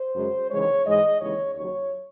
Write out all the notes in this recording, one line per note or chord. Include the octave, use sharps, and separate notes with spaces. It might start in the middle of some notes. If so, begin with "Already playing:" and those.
Already playing: C5
F#2 C#3 G#3
D#2 C#3 E3 G#3 C#5
G#2 E3 G#3 D#5
D#2 C#3 E3 G#3 C#5
D#2 C#3 F#3 C#5